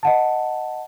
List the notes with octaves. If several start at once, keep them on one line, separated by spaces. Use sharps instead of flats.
D#5 F#5 A5